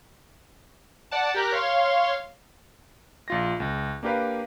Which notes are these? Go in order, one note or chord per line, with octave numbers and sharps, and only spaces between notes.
D5 F#5 A5
G4 A#4 F#6
C#5 F5 C6
A#1 F4 A#6
C#2
A#3 D4 G4 A#4 B4 F5